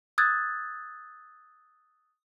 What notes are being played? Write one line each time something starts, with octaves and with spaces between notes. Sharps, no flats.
D#6 E6 F#6 G#6 A6